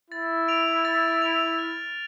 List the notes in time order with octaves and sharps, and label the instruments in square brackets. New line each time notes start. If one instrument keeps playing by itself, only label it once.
[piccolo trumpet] E4 [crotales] A6
[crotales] D7 F7
A6
D7 F7
F6